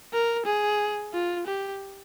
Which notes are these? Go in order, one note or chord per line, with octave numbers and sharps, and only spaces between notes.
A#4
G#4
F4
G4